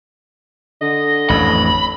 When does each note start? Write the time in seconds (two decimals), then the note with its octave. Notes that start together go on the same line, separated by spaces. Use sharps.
0.81 D3 D#5
1.29 A1 F2 B5